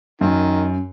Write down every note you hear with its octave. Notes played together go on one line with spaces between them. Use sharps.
F#2 D#3